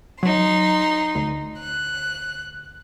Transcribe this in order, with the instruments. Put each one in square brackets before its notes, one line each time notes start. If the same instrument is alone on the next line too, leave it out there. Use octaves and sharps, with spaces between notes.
[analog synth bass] F#3 [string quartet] D#4 C6
[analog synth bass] D2
[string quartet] F#6